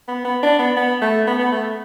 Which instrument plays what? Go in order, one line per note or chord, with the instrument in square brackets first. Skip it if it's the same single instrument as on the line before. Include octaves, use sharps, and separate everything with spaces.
[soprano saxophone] B3
B3
D4
B3
B3
A3
B3
B3
A3